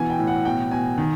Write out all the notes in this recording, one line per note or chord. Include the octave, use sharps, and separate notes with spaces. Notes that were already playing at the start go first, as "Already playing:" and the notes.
Already playing: B2 E3 G#5
G5
A2
F#5
B2 G5
B2 G#5
D#3